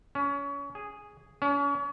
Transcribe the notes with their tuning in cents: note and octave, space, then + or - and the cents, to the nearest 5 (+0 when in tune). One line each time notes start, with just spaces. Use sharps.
C#4 +25
G#4 -5
C#4 +35